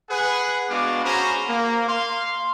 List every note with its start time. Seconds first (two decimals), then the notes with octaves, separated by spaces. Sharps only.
0.10 G#4 B4 F#5
0.70 G#3 B3 D4 F#4 F5 D6
1.04 C#4 F#4 G#4 C5 A#5 B5
1.49 A#3
1.88 F5 C6